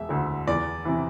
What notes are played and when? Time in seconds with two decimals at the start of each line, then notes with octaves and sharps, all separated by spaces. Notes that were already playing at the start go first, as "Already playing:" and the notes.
Already playing: E1 E5
0.09 D2 D3
0.48 E2 D5
0.85 C3 E3